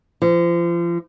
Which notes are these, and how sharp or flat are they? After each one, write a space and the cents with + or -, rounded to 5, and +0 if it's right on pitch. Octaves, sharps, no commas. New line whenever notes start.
F3 -35